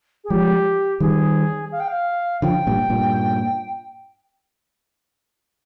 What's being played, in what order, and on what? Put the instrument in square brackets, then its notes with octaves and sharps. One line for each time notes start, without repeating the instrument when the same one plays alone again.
[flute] G#4
[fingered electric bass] F3 G#3 [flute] G4
[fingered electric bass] D#3 G3 [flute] G#4
[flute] F5
G5
F5
[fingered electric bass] D3 F3 [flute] G5
[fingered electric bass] G2 A#2
G2 A#2